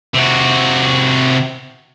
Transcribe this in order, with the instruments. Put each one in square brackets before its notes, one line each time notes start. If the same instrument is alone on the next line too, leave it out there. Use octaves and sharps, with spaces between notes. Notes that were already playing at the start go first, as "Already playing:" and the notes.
[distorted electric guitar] C3 F#4